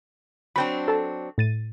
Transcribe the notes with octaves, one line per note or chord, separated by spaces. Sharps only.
F#3 C4 D4 G5 B5
A4 A5
A2 A6 D#7